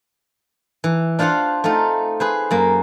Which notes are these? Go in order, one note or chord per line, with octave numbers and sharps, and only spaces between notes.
E3
D4 F4 C5 F5 F#5
A3 C4 D#4 F4
G#4 B4 C5
F#2 A#3